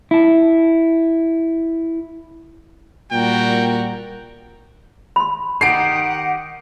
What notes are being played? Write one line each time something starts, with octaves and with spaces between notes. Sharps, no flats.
E4 A5
A#2 G3 F#4 A#4 G5
B5 C6
D#3 D#4 G4 F#5 C7 D7